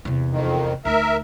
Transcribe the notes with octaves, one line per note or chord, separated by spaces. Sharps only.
E2 C3
F2 D#3
D2 D#4 A#4 E5